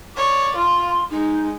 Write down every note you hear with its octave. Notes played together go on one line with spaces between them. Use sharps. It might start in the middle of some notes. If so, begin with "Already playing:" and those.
C#5 D5
F4 C6
G#3 D#4